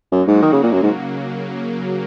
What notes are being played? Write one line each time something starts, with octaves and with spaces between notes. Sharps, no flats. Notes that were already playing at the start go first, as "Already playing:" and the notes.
F#2 F#3 A#3 D#4 F#4
G#2
D#3 F#3 A#3 F#4
C#3
A#2
F#2 C#3 F#3 A#3
G#2